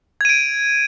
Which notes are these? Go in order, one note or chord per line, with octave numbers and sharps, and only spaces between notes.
G#6 D7 D#7